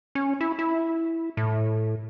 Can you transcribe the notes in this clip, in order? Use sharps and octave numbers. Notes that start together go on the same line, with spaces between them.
C#4
E4
E4
A2